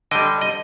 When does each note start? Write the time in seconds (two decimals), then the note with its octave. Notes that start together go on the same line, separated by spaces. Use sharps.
0.11 D3 G3 D#5 G5
0.41 D#5